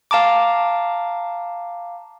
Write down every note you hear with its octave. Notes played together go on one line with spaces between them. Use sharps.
F5 A5 A#5 D6